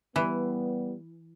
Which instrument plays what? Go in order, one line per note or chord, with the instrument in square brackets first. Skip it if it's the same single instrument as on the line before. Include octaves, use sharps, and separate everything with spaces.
[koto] E3 [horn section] G3 B3